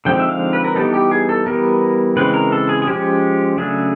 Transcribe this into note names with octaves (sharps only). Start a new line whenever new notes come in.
D3 F3 G#3 C4 D#4 G5
E5
F5
B4
A#4
E3 G3 B3 D#4 A4
G4
G#4
A4
E3 G3 B3 A#4
C#3 E3 G#3 C4 B4
A#4
A4
G#4
G#4
F3 G#3 C#4 G4
C#3 F#3 A3 D4 G#4